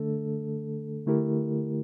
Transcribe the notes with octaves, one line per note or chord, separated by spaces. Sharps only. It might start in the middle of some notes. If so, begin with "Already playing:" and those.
Already playing: D3 A3 D4 A4
D3 A3 E4 G4 A#4